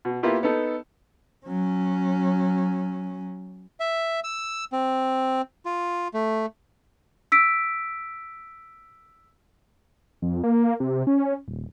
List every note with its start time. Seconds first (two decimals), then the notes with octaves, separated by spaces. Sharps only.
0.05 B2
0.23 A#3 B3 E4 F4 G4
0.43 B3 D#4 A4
1.46 F#3 C#4
3.80 E5
4.24 E6
4.72 C4
5.66 F4
6.14 A3
7.32 E6 B6 D7
10.22 F2
10.44 A#3
10.80 C3
11.07 C#4
11.48 D#1